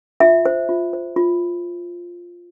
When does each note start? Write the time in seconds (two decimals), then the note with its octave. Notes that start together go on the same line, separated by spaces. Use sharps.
0.20 F4 E5
0.45 C5
0.69 F4
0.93 C5
1.16 F4